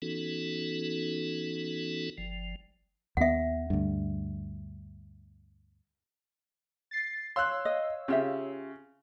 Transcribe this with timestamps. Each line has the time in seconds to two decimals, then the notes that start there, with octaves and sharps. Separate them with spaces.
0.02 E3 B3 C#4 D#4 F#4 A4
2.18 G1 F3
3.17 D#2 B3 E5 F#5
3.70 D2 G2
6.91 A6 C7
7.36 C#5 F5 C6 E6 F#6
7.65 D#5
8.08 C#3 F4 G4 E5